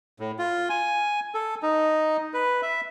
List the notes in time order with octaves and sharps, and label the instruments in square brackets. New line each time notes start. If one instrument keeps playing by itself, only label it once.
[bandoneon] A2
F4
G#5
A4
D#4
B4
E5